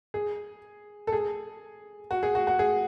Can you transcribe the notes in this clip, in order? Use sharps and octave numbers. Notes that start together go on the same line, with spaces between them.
G#4
A4
G#4
F#4
G#4
F#4
F#4
G#4